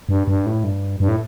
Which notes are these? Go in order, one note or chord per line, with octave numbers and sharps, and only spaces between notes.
G2
G2
A2
G2
G2
A2